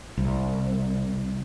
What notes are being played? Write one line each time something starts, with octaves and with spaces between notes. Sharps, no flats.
C2